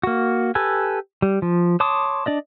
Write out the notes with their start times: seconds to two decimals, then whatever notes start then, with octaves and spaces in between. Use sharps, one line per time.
0.03 A#3 F#4
0.55 G4 A4 B4 G#5
1.22 G3
1.42 F3
1.80 C#5 A5 C6 D6 D#6
2.26 D4 D5 D#5